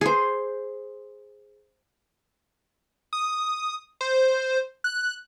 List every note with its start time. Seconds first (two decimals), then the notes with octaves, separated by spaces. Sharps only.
0.01 G#4 C5
3.13 D#6
4.01 C5
4.84 F#6